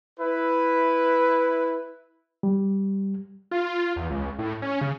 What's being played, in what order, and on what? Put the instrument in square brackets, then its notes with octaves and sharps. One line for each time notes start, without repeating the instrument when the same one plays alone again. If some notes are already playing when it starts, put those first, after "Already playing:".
[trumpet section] E4 B4
[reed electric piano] G3
[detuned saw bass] F4
E2
C#2
A2
C#4
C#3